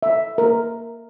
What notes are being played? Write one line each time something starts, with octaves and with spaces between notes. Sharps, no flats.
E5
A#4